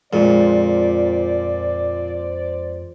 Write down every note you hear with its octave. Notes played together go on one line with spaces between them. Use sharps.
F2 A#2 F3 G#3 C5 D5